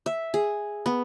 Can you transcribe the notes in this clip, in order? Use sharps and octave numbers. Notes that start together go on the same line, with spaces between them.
E5
G#4
B3